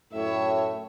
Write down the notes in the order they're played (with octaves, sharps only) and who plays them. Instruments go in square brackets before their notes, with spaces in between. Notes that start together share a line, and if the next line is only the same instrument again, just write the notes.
[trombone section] F#2 A2 [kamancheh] C#5 E5